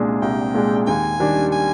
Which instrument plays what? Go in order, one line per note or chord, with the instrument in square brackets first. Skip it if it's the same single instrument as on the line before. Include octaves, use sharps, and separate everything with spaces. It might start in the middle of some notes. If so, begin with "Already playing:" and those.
Already playing: [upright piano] C2 A#2 G#3 D4 G#4
[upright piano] C2 [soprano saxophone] G5
[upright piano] A#2 G#3 D4 G#4
[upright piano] D#2 [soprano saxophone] G#5
[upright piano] D#3 G3 D4
[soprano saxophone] G#5